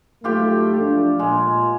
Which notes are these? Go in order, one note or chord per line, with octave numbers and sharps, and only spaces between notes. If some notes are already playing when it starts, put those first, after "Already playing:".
G#2 F#3 A3 F4 G4 G5
F3 D4
A#2 G#3